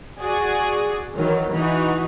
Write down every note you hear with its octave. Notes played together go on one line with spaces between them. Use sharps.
F#4 G#4 D5
D#3 E3 F#3
E3 D#4 F#4